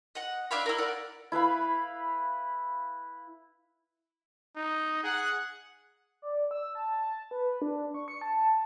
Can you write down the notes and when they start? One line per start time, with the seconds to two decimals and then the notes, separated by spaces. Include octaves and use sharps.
0.15 D#5 F#5
0.51 D4 E5 F5 B5
0.66 E4 A#4
0.78 A#4 D5 F#5
1.32 E4 B4 F5 B5
4.56 D#4
5.03 G#4 F#5
6.22 D5
6.51 E6
6.75 A5
7.31 B4
7.62 D4
7.94 C#6
8.08 C#7
8.21 A5